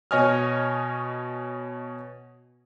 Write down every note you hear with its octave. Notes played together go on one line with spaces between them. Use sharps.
B2 C#5 D#5 G#5 D#6 F6